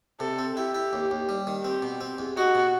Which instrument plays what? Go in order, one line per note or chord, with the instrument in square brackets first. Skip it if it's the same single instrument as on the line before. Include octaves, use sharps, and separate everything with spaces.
[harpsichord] C3 [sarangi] A4
[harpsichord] C4
[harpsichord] E4 [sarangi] G4
[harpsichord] E4
D#2
D#2
G3
D#3
[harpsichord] C4 [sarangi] G4
[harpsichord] B2
C4
E2
[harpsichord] D#4 [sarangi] F#4
[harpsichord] B2